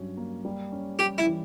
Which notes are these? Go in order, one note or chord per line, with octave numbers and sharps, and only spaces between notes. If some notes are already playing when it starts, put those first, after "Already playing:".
Already playing: G2 F#3 C#4
A#3
G3
C#4
G3 G4
E4
E3